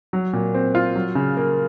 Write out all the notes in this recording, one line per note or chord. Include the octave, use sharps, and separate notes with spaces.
F#3
A#2
C4
F4
F#3
C#3
A#3